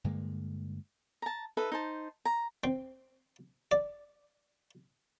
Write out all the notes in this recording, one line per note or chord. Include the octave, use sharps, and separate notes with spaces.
G2 D3 G#3 A#3
A5 A#5
D#4 A4 B4 E5
D#4 C5 A5
A#5
C4
D5